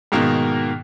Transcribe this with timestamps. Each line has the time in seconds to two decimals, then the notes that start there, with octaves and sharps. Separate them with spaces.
0.12 G#2 B2 D#3 A#3